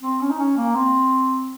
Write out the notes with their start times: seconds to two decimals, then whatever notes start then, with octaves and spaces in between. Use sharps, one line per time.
0.02 C4
0.21 C#4
0.31 D#4
0.39 C#4
0.58 A#3
0.75 C4